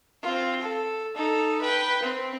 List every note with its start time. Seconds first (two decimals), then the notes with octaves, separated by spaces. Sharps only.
0.23 C4 F4
0.62 A4
1.15 D#4 A4
1.62 B4 G5
2.03 C4